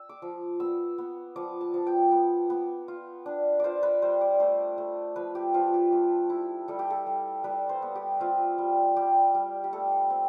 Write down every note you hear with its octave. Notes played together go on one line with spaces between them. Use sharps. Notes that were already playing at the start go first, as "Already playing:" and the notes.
Already playing: E6
D6
F3
B3 E6
B3
F3 D6
A5
F3
G5
B3
B3
F4
D4
F4 C5 D5
B4
G3 C5
D5
A3 C5
A3
F3 B4
G4
F3 F4
G4
A3
E4
G3 A4
G4
A4
G3
G3 B4
C5
B3
G4
C4 F4
G3
G3 G4
G3
G4
A3 A4
C4